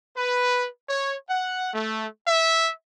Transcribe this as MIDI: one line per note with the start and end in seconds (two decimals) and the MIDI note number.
0.17 0.68 71
0.89 1.15 73
1.29 1.71 78
1.74 2.07 57
2.27 2.72 76